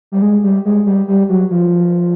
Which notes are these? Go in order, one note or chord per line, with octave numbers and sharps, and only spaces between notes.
G3
G#3
G3
G#3
G3
G3
F#3
F3